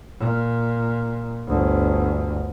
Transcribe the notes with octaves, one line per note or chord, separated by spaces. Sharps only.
A#2
G1 D2